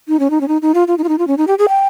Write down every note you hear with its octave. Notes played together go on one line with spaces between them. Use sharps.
D#4
C#4
D#4
C#4
D#4
D#4
F4
F4
D#4
F4
D#4
F4
C#4
D#4
G4
G#4
G5